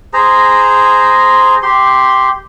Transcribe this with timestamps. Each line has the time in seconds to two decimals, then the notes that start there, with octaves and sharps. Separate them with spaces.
0.13 G#4 C5 A#5
1.63 G4 C6